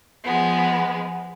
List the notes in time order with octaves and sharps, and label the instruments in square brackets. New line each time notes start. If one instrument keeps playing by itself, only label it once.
[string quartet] F3 G#3 B3